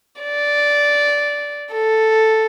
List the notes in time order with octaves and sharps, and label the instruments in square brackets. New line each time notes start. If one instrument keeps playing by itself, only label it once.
[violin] D5
A4